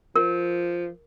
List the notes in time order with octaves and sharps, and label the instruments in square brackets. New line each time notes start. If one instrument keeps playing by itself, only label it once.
[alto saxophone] F3 [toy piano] A#4